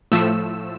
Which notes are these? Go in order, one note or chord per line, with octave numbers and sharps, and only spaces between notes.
A2 F3 A3 E6